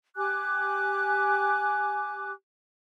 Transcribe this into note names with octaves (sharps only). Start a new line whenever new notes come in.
G4 G#5 D6 F#6